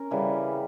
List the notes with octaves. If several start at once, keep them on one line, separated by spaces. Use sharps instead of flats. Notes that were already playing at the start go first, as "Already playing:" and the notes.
Already playing: C#4 A#4
C#3 E3 G3